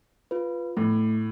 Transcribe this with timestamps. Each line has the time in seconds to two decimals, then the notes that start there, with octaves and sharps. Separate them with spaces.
0.31 F4 B4
0.77 A2 A3